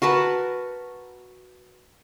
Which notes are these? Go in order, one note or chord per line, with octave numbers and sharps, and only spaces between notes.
F#4 A#4 B4 A5